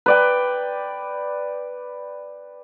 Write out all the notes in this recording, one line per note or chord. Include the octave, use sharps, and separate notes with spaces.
B4 D5 G5